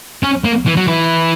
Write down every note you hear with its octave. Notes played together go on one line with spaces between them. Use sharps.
C#4
A#3
E3
F#3
E3